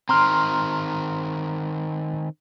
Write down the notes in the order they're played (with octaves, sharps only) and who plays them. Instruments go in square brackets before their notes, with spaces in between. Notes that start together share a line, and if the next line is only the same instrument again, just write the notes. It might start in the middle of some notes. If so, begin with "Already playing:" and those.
[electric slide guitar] D#3 C4 [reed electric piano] A#5 C6 F6